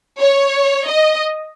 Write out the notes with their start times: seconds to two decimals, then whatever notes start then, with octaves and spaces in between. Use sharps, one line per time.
0.20 C#5
0.88 D#5